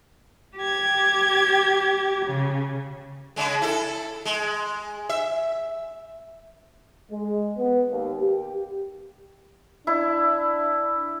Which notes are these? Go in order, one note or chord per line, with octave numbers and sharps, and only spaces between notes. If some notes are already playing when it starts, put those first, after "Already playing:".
G4 G#6
C#3
C#3 G#3
E4 A4
G#3
E5
G#3
B3
D#2
G4
D4 E4